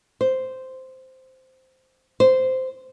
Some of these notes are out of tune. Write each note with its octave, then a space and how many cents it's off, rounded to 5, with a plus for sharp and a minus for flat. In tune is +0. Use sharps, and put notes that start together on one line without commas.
C5 -5
C5 -10